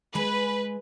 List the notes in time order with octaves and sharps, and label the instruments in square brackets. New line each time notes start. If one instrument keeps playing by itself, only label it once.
[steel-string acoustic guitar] G#3 G#5 [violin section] B4